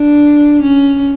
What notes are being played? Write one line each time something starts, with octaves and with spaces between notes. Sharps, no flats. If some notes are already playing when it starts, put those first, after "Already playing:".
Already playing: D4
C#4